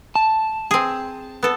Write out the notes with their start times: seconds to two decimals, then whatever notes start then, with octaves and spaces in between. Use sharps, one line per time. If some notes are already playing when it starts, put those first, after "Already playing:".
0.16 A5
0.71 C4 G#4
1.43 B3 A4